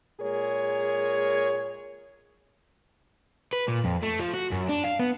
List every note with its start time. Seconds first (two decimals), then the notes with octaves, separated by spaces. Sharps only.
0.21 A#2 G#3 G#4 A#4 C#5
3.53 B4
3.69 A#2
3.85 F2
4.03 A3
4.20 F3
4.34 F#4
4.52 F#2
4.69 D4
4.84 F5
4.99 B3